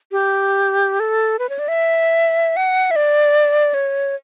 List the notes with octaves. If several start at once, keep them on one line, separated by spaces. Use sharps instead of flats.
G4
A4
B4
C#5
D5
E5
F#5
E5
D5
C#5